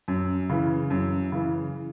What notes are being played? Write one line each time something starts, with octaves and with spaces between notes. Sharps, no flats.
F#2
C#3 E3
F#2
C#3 E3